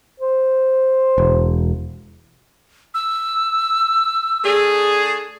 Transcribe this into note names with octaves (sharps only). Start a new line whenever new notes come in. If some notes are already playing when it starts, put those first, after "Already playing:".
C5
E1
E6
A3 D4 G#4